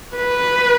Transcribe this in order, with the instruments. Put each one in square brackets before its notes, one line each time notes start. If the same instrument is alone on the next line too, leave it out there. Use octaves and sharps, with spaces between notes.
[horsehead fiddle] B4